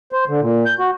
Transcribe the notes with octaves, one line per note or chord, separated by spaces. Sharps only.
C5
D3
A#2
G6
F#4